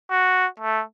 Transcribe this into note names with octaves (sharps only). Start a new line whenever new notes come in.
F#4
A3